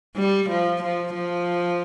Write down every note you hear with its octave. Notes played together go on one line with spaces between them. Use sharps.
G3
F3
F3
F3